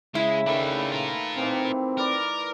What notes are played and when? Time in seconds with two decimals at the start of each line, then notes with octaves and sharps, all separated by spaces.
0.15 C#3 G#3 E4
0.47 D#3 A3 D4 B4 E5
0.92 F4 A#4
1.37 D#3 E3 C4 F5
1.97 A#4 B4 D5